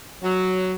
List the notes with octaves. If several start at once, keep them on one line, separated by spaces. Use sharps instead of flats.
F#3